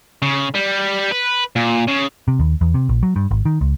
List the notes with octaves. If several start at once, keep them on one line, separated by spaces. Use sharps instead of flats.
C#3
G3
B4
A#2
C#3
C3
D#2
E2
C3
A#1
F#3
G2
G#1
D#3
C#2